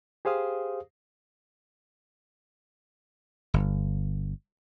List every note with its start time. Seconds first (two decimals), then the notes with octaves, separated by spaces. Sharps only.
0.25 G4 G#4 C5 F5 D#6
3.54 G1